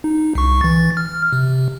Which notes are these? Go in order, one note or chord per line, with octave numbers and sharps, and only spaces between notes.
D#4
C2 C#6
E3 A6
F6
C3